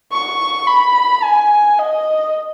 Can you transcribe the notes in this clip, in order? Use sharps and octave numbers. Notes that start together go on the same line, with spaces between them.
C#6
B5
G#5
D#5